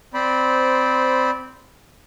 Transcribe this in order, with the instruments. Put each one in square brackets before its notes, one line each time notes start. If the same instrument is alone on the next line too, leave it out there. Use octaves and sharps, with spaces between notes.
[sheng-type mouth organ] C4 C5 D5 B5